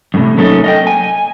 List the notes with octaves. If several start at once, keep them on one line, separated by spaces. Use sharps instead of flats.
F#2 A2 C3
F#3 A3 A#3 C#4 D#4 A4
D#5 F5 G5
G#5